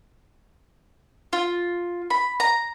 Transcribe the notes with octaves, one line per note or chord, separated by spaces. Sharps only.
F4
B5
A#5